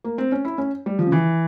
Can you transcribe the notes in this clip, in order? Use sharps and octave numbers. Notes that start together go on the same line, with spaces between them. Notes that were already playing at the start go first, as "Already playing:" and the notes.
A#3
C4
C#4
E4
C#4
G3
F3
C#3
E3